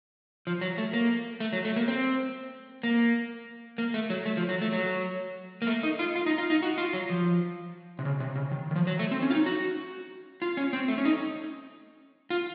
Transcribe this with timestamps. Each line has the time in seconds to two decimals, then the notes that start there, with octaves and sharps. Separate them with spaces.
0.47 F3
0.61 F#3
0.78 A3
0.93 A#3
1.40 A3
1.53 F#3
1.65 A3
1.76 A#3
1.88 C4
2.83 A#3
3.78 A#3
3.94 A3
4.10 F#3
4.25 A3
4.37 F3
4.49 F#3
4.62 A3
4.73 F#3
5.62 A#3
5.67 A3
5.83 D#4
5.99 F4
6.16 F4
6.26 D#4
6.38 F4
6.50 D#4
6.62 F#4
6.78 F4
6.93 F#3
7.10 F3
7.99 C3
8.05 C#3
8.20 C3
8.36 C#3
8.52 D#3
8.71 D#3
8.75 F3
8.87 F#3
8.99 A3
9.11 C4
9.22 C#4
9.30 F4
9.35 D#4
9.46 F#4
10.42 F4
10.57 C#4
10.73 C4
10.88 A3
10.98 C#4
11.05 D#4
12.30 F4